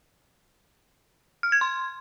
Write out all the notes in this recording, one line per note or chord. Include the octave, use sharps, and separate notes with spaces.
F6
G#6
C6